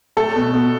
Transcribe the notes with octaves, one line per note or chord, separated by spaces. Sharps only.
A3 A4
B2
B2